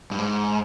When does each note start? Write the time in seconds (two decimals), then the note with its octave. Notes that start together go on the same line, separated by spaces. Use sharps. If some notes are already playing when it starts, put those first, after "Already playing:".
0.11 G2
0.18 G#2